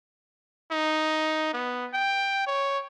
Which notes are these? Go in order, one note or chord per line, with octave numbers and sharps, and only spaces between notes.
D#4
B3
G5
C#5